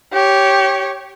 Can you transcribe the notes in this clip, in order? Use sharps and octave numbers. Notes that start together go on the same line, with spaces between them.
G4 C#5